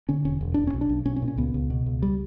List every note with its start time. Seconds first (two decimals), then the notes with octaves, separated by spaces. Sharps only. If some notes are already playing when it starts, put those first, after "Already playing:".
0.09 D3 C#4
0.25 E1 C#4
0.41 E1
0.54 E1 D4
0.67 C#4
0.73 B1
0.81 D4
0.89 B1
1.05 B1 C#4
1.16 C#4
1.22 A#2
1.28 C#4
1.37 C#2 B3
1.54 C#2
1.70 B2
1.86 C#2
2.02 G3